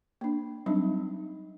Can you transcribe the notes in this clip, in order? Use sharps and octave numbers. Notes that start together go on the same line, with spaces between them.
A#3 D4
F#3 G3 C4 D4 D#4